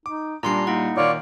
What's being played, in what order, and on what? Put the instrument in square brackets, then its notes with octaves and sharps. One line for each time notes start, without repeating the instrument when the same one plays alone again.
[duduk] D#4 [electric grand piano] D6
[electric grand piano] A#2 G3 [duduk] D4 [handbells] A#5 C6 C7
[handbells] A#3 E4 F#5 [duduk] D#4
[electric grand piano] A#2 D#3 [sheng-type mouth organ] F4 C#5 D5